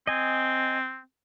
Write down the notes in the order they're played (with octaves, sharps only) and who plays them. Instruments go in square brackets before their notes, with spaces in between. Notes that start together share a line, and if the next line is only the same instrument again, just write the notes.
[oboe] C4 [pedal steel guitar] D#5 G#5